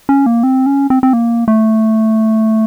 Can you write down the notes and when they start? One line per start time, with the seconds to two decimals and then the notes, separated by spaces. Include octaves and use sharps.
0.09 C#4
0.26 A#3
0.43 C4
0.66 C#4
0.90 C4
1.03 C4
1.13 A#3
1.48 A3